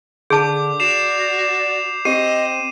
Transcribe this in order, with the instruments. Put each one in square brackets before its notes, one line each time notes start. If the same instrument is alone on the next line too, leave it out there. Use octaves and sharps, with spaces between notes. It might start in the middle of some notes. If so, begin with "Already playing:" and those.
[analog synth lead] D3 [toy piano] G#4 A5 [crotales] D6 G6
[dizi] F#4 [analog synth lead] D5 [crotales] C7 E7 F7
[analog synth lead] C4 [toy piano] G4 [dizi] D#5 [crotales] D#7